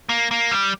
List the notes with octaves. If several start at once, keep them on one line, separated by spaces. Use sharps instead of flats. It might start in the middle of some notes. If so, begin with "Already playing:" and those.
A#3
A#3
G3